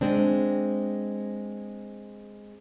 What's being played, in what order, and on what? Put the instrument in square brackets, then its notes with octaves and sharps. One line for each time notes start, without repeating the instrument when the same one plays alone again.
[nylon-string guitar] G#3 C4 D4